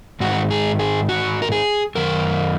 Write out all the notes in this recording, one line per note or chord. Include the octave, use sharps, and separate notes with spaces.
G#2 D#3 F#4
G#4
G#4
F#4
A#4
G#4
F#2 D#3 A#4